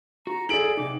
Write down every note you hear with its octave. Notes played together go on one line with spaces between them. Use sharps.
F#4 A#5
E4 G#4 A4 D5 D7 F#7
C3 D#4 D6